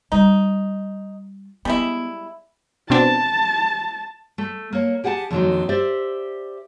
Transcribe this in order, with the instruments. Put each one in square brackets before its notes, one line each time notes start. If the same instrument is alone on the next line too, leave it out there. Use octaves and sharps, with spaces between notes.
[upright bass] G3 F4 [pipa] D#4
[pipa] G3 G#3 E4 [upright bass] B3
[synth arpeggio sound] B2 C4 D4 [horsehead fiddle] A5
[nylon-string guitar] A3
A#3 C#5
G4 G#4 F#5 G#5 A5
F2 A#2 D3 D#3 F3 F#3
G4 C5 D5 E5